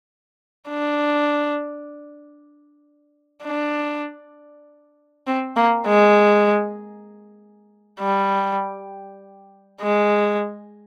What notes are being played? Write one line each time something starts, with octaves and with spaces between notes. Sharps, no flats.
D4
D4
C4
A#3
G#3
G3
G#3